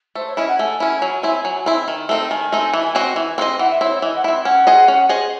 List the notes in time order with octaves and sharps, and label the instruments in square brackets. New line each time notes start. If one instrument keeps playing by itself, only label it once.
[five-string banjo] A3 [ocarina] C5
[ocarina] C#5
[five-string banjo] C#4 E4 [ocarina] D#5
[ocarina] F#5
[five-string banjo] A3 [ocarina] G#5
[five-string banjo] C#4 E4
F#3
C4 E4
F#3
C4 E4
D#3
A3 C4 D#4
[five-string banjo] D#3 [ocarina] G#5
[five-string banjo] A3 C4 D#4
E3
C4 F#4 C5 D#5
E3
C4 F#4 C5 D#5
[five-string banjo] E3 [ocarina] F#5
[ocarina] E5
[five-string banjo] C4 E4 [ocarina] C#5
[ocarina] C#5
[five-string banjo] E3 [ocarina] D#5
[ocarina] F#5
[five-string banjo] C4 E4 [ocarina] E5
[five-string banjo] C#4 [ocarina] F#5
[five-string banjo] G#4 C5 D#5
C#4
G#4 C5 D#5